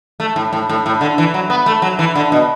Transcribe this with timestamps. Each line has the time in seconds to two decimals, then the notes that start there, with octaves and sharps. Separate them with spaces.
0.20 A3
0.36 A2
0.53 A2
0.69 A2
0.86 A2
1.01 D3
1.18 E3
1.34 F#3
1.50 B3
1.66 A3
1.82 F#3
1.99 E3
2.15 D3
2.32 B2